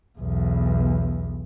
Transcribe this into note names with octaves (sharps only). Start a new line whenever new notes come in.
B1 E2